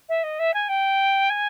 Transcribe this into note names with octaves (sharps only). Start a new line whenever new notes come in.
E5
D#5
E5
G#5
G5
G#5